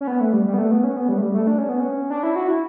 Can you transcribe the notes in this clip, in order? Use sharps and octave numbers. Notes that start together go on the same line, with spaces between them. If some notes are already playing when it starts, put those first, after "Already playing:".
C#4
B3
A3
G3
G3
B3
A3
B3
C#4
B3
G3
A3
G3
A3
D4
C#4
B3
C#4
D4
E4
F#4
E4